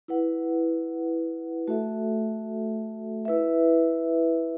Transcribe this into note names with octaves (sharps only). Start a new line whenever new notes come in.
E4 B4 F#5
A3 F#4 A4 E5
E4 B4 E5